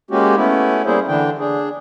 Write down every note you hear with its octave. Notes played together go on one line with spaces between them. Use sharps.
G#3 A#3 C#4 F#4 G4
A3 B3 C#4 E4
G3 A#3 E4 G#4 C5
D3 E3 D4 G5
D4 G#4